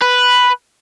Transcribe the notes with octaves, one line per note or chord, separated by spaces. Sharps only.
B4